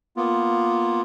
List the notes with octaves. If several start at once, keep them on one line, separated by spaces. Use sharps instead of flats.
A#3 B3 F4